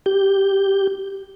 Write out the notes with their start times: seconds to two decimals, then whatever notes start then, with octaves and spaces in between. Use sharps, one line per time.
0.06 G4 G6